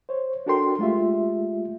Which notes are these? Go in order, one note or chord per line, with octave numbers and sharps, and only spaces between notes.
C5 C#5
D4 F#4 A4 A#4 G5 C6
G#3 A3 F4 G4 E5